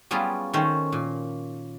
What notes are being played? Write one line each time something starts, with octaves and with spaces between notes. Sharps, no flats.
F#3 G3 B3 C#4 F4 G#4
D#3 A3 C#4 C5
A#2